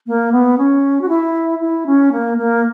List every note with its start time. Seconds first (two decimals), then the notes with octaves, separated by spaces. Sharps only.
0.07 A#3
0.32 B3
0.58 C#4
1.01 F#4
1.09 E4
1.61 E4
1.86 C#4
2.12 A#3
2.38 A#3